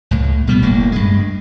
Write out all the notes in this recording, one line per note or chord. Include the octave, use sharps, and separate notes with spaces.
C#2 A2
B2 G3 B3
F#1 A2 A#3
G2 G#3